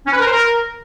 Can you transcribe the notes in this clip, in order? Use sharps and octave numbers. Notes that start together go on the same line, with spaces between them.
C#4
B4
A#4
C5
A#4